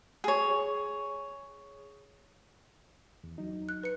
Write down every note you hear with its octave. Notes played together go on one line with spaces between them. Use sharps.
G#4 C#5
E2
F#3 D#4
F#6
B4 C#7